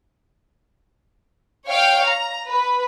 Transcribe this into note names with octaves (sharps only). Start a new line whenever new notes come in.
C#5 F5 G5
A#5
B4